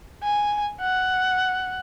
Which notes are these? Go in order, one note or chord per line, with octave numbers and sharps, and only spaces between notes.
G#5
F#5